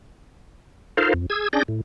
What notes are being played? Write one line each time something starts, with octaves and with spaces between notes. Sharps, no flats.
D#4 F4 A4 A#4 C5 F5
F2
G#4 E6 G#6
C#4 D4 G#4 D5 G6 A#6
A2